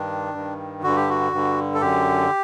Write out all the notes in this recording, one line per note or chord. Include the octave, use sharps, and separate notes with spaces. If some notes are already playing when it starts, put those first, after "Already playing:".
Already playing: G2 D#3 D4
G2 D#3
G2 D3 F#4
G4
F#4
G2 D3
A4
F#2 D3 G4